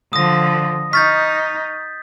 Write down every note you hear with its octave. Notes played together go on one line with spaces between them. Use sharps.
D3 F3 D#6 A#6
D#4 C#6 F6 G6 A6 B6